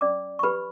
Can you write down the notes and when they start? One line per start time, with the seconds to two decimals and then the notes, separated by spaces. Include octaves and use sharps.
0.01 C#4 D5 D6
0.39 C#6
0.43 G4 B4 B5